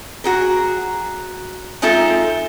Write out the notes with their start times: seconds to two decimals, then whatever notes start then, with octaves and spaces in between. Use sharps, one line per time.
0.24 F#4 G#4 A#4
1.82 G#3 C4 D#4 F4 A4 E5